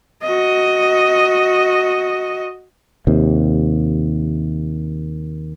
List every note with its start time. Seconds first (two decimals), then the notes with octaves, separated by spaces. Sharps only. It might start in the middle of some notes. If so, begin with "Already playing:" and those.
0.22 F#4 D#5
3.07 D#2 C3